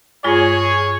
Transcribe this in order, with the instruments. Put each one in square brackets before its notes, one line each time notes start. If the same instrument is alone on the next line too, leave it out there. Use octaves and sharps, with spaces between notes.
[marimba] G2 G#3 F4 [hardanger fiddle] G#4 [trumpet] C#5